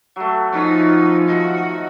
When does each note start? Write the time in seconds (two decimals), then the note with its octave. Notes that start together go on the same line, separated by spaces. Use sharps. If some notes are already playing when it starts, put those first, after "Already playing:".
0.16 F#3 A3
0.53 F3 B3 C#4 D#4
1.27 D#3 F#4 D#5